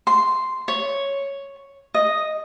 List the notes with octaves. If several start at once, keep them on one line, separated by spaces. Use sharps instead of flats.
C6
C#5
D#5